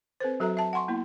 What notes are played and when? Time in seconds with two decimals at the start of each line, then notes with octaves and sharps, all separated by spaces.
0.20 C4 A4 B4 C5
0.40 F#3 F#4 A4 E5 A#5
0.57 E5 A5
0.73 F#5 G#5 C6 C#6
0.88 A#3 B3 E4